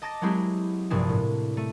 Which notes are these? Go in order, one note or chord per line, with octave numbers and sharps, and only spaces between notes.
D#5 A5 D6 A6 A#6
F#3 G#3 C4 E4 G4 G#4
A#1 G2 C3 D4 G#4 E7
A2
A3 D#7